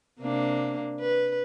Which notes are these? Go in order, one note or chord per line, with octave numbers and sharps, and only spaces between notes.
C3 A#3 D4
B4